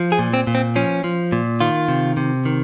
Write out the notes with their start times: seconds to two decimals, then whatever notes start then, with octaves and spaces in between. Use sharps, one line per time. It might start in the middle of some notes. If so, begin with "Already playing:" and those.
Already playing: F3
0.12 G#4
0.19 A#2
0.34 C4
0.47 A#2
0.55 C4
0.76 F3 C#4
1.04 F3
1.32 A#2
1.61 D#3 F4
1.88 C3
2.17 C3
2.46 D#3